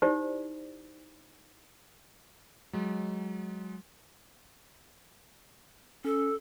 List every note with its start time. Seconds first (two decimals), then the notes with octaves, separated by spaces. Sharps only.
0.02 D#4 E4 G4 C5 D5
2.73 F#3 G#3
6.05 C#4 A4